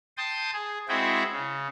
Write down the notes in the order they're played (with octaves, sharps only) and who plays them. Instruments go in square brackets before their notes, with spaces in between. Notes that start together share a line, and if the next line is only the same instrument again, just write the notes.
[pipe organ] G5 A5 C6 D#6
G#4
G#3 C4 E4 F#4 G#4 G5
C#3